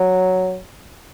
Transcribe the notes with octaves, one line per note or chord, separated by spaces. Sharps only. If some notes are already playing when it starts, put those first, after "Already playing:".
Already playing: F#3